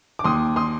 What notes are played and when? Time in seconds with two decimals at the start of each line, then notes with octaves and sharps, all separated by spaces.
0.19 D6
0.24 D#2 C6 D#6
0.56 C6 D#6